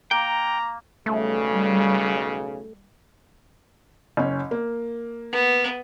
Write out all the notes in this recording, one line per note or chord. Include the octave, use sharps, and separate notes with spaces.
A#3 G5 A#5
B1 C#3 G3 A3
F#1 C#4
A#3
B3